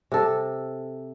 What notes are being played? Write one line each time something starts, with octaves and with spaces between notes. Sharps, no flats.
C3 A4